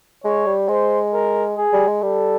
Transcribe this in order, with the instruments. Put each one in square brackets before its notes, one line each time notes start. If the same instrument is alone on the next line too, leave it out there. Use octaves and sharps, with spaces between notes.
[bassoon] G#3 [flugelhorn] C#5
[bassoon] G3
[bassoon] G#3 [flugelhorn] C5
[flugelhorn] A#4
G#4
[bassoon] G3
G#3
[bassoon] G3 [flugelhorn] A4